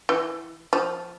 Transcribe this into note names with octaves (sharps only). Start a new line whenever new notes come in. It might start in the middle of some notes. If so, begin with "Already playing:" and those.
E3
F3